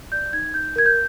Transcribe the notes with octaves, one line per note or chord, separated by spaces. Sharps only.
D5 G6
D#4 G#6
D#4 G6
A#4 G#6
G6